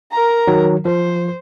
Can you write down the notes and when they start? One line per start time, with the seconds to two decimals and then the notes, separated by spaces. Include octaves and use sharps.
0.12 A#4 A#5
0.47 D#3 F#3
0.85 F3 C5